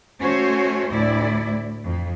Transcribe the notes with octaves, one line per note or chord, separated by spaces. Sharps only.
A3 C#4 F#4 C5 C#5
D2 A2 E4 D5
F2 F3